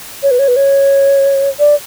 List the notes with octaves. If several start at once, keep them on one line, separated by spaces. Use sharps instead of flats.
C#5
B4
C#5
B4
C#5
D5